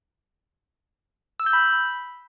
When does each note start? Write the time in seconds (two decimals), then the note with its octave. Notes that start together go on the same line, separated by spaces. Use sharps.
1.40 E6
1.46 G6
1.53 B5